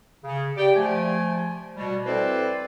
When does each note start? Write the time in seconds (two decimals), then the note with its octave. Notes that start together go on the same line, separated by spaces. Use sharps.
0.24 C#3
0.57 G4 D5 G5
0.76 F3 A3 G#5
1.77 B2 G3
2.06 C4 E4 A4 B4 C5 D5